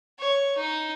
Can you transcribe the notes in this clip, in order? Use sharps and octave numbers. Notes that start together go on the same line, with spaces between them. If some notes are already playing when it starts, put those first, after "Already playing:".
C#5
D#4